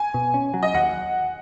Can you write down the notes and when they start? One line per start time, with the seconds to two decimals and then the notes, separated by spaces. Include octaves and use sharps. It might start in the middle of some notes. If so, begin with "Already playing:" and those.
Already playing: G#5
0.14 B2
0.34 C#4
0.54 F#3
0.63 D#5
0.74 D#2 F#5